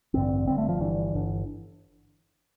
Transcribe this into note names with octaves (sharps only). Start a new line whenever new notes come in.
A1 G2 D3 C4
G1 G2 D3 C4
A3
F3
G1 G2 D3 E3
G1 D3